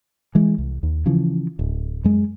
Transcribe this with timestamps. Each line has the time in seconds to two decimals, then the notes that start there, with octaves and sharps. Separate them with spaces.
0.35 E3 G#3
0.58 C2
0.83 D#2
1.06 C#3 E3 F3
1.59 D1
2.04 F#2 G#3